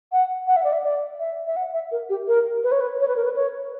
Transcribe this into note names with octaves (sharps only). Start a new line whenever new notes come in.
F#5
F#5
E5
D5
E5
D5
E5
E5
F#5
E5
A#4
G4
A#4
B4
C#5
B4
C#5
B4
A#4
B4
C#5